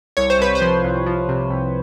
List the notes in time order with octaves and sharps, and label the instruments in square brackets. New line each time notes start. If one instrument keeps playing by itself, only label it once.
[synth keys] C2 C#5
C5
C2 B4
C5
F3
C2
F3
C3
C2